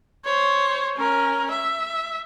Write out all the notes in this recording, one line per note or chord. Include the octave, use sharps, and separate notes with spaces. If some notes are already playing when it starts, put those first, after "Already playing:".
C5 C#5
C#4 A#4
E5